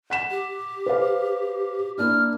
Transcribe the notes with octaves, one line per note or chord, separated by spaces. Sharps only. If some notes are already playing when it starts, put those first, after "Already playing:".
F#5 B6 E7
G4
B4 C5 F5
A#3 D4 E4 F6